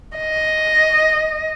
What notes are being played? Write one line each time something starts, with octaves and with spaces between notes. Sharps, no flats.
D#5